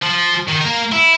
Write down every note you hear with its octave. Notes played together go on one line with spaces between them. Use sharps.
F3
D#3 D#4
A#3 A#4
E4